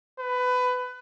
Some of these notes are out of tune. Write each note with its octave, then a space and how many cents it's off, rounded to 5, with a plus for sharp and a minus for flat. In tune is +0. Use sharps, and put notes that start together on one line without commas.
B4 +20